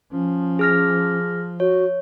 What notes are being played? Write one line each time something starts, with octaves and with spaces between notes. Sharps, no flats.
F3 C#4
G#4 F6 A#6
F#4 C#5